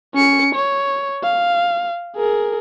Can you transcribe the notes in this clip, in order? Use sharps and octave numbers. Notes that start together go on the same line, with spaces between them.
C#4 C#7
C#5
F5
G#4 A#4